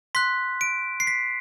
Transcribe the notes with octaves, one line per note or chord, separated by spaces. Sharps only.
C6 F#6 B6
D7
C7
B6